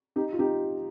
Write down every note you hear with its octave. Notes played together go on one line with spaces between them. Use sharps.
D#4 G4
F4
D#4 G4